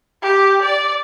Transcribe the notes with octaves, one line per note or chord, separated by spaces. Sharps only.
G4
D5